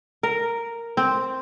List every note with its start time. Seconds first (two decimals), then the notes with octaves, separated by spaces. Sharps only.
0.23 A#4
0.97 C4